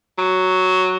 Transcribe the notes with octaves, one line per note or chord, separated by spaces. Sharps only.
F#3